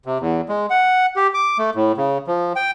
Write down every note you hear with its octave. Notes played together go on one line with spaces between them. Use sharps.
C3
E2
G#3
F#5
G4
D6
A3
A2
C#3
F3
G5